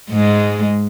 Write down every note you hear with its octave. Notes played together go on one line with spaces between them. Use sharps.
G#2 G#3